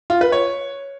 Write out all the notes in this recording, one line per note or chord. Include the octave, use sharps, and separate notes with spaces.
F4
B4
C#5